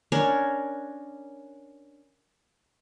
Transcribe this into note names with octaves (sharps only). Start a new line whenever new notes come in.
C#4 D4 A#4 C#5